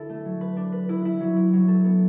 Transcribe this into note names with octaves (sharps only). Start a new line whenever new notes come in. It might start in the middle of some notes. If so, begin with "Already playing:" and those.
Already playing: D3 E4 F#4 A4
A3
F#3
B4
D4
B4
E4
E4
F#3
E4
F#3
A4
B3